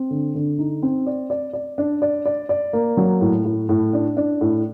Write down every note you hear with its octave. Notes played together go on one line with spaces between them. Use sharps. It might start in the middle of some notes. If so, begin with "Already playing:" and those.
Already playing: C4
D3
D3
D#4
C4
D5
D5
D5
D4
D5
D5
D5
A#3
F#3
A2
A2
A2
D4
D4
A2